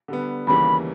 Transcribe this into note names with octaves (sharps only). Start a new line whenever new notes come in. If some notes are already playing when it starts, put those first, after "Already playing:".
D3 G3 B3
D#2 C#3 E3 G3 A#3 B5